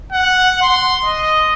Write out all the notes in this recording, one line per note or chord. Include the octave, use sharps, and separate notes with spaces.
F#5
C6
D#5